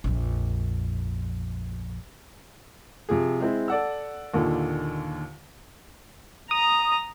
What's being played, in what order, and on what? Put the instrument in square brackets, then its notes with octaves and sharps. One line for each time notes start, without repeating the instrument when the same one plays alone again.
[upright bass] A#1 F2
[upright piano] C3 F3 G#4
G#3 C4 E4
A4 D5 F#5 E6
D#2 A#2 D3 D#3
[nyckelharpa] A#5 [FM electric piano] D#6